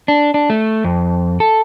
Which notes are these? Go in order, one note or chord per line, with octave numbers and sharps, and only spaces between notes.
D4
D4
A3
F2
A4